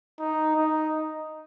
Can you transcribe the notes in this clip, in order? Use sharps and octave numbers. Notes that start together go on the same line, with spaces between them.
D#4
D#4